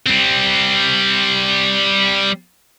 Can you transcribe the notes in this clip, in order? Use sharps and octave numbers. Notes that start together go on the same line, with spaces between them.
G3 C4